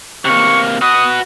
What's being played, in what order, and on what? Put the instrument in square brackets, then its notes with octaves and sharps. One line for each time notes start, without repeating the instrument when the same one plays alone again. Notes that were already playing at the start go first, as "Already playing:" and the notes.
[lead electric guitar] C3 A#3 [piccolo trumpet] C#6
[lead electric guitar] F#4 B4 [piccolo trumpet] D#6